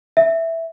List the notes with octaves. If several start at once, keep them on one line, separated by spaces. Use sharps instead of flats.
E5